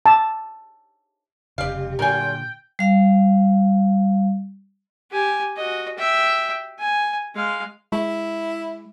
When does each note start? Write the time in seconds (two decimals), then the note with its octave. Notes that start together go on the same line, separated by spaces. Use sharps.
0.06 A5
1.58 F1 C#3 G3 G4 D5 F5
1.99 A#2 D3 F#3 A3 F4 A#4 G5 G#5
2.79 G3 F5
5.11 G4 G#5
5.56 F#4 D#5
5.98 E5 G5
6.79 G#5
7.35 G#3 F5
7.92 G#3 E4